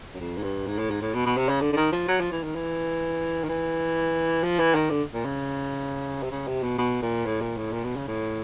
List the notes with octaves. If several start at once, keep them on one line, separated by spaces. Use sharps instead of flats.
F#2
F2
G#2
G2
G#2
A2
G#2
A2
B2
B2
C3
C#3
D3
D3
D#3
F3
F#3
F3
E3
D#3
E3
D#3
E3
F3
E3
D#3
D3
A#2
C#3
C3
C#3
C3
B2
B2
A#2
A2
A#2
A2
A#2
B2
C#3
A2